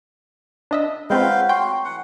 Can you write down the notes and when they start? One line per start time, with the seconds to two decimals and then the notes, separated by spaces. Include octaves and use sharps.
0.71 D4 D#5 E5
1.10 F#3 G#3 A3 C4 F4 B4 F5 G5
1.49 F#4 G5 C6
1.85 E3 F#5